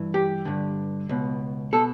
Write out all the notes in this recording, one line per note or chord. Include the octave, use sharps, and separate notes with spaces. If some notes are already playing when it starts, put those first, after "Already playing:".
Already playing: G2 E3
G4
G2 D3
C#2 B2
B2 A4